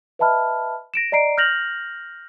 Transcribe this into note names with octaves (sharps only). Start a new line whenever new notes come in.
B4 D#5 E5 A5 B5 F6
A#6 D7 E7
D5 D#5 A#5 C7 D7
F6 G6 A#6 F7 F#7